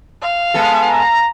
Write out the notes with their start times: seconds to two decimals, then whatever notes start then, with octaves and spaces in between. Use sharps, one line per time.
0.23 F5
0.54 G#3 B3 A4
0.89 A#5